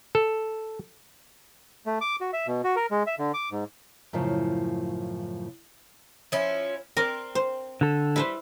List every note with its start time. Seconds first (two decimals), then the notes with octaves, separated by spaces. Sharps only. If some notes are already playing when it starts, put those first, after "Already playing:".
0.15 A4
1.86 A3
2.01 D6
2.21 F#4
2.33 E5
2.47 B2
2.64 F#4
2.76 A#4
2.91 G#3
3.07 E5
3.19 D3
3.34 D6
3.52 G#2
4.13 F#2 A2 C#3 F3
6.32 F3 C#4 E4
6.97 C4 A#4 D5
7.35 C5
7.81 D3 A4
8.16 G3 E4 B4 C5